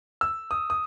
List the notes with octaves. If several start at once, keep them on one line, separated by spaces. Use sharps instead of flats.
E6
D#6
D#6